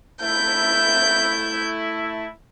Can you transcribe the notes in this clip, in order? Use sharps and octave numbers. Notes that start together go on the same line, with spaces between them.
A3 E4 G6